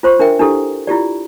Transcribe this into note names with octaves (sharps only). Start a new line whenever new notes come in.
F4 C5 C6 C#6
D4 A#4 E5 G5
D4 E4 G4 A4
E4 F4 G4 D5